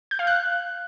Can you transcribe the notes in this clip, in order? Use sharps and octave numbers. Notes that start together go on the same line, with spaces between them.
G6
F5
F#6